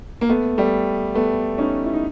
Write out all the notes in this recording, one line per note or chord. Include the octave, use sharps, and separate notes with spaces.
A#3
A3 B3
G3 A3
A3 B3
C#4 D#4
E4
D#4